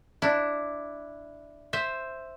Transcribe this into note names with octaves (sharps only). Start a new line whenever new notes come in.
D4 E4
C5 E5